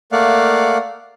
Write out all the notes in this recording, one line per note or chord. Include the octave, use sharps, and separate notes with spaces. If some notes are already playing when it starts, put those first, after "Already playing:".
A3 A#3 D5 F5 F#5